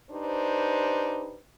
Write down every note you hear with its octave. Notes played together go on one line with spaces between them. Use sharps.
D4 D#4 G4 B4 C5